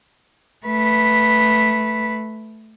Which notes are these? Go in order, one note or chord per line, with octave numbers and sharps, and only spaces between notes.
A3 B4